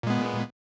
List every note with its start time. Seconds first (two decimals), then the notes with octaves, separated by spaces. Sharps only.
0.03 A#2
0.07 G#3
0.10 B3